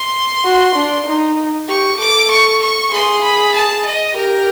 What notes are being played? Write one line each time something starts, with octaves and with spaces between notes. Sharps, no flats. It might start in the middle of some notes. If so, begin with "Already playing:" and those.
Already playing: C6
F#4
D4
D#4
G4 C#6
A4 D6
C#6
C#6
G#4 C6
B5
A5
D#5
G4 A#4